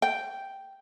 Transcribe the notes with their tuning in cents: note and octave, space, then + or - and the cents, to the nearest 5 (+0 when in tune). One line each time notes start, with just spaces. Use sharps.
G5 -5